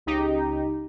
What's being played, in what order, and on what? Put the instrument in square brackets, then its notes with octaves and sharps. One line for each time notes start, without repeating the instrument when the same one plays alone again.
[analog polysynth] C#2 D#4 G4